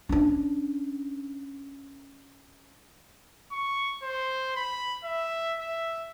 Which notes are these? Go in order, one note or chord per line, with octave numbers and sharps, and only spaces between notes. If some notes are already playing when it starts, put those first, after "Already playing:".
C#4 D4
C#6
C5
B5
E5
E5